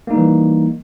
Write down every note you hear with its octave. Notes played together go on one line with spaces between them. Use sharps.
E3 G3 A#3 D#4